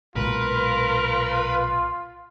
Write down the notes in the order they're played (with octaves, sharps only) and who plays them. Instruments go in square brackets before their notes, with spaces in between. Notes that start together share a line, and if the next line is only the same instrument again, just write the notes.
[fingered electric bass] B1 A#2 G#3 [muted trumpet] F4 [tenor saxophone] A#4 [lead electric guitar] B4